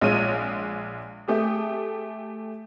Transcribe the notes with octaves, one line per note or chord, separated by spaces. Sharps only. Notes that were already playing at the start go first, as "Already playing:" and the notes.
A#1 G#3 F4 C#5 D#7
A3 G4 G#4